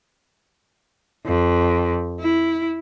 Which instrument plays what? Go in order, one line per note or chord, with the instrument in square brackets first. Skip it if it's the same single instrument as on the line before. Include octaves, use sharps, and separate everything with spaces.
[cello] F2
E4